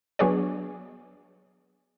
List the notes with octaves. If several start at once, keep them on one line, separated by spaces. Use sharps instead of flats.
F#3 B3 D4 G#4 C#5 D5